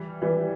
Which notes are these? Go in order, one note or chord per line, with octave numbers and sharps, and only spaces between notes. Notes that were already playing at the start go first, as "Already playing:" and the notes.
Already playing: E3 G3
E3 G3